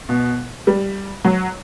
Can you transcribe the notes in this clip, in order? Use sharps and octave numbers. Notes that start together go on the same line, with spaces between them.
B2
G3
F#3